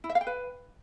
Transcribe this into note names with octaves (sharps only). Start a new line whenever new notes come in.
E4
E5
F5
G5
B4